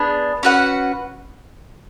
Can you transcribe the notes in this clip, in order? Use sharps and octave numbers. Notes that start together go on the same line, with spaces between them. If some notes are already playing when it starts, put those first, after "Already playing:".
Already playing: B3 D4 G#4
C#4 F#4 B4 F#5